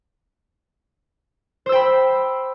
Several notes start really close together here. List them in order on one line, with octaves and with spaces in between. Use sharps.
C5 E6 G5 B5